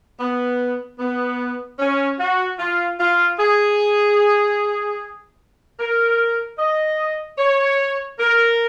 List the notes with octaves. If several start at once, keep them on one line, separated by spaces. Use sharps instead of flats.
B3
B3
C#4
F#4
F4
F4
G#4
A#4
D#5
C#5
A#4